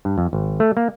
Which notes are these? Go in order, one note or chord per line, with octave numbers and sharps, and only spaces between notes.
G2
F2
G#1
A3
A#3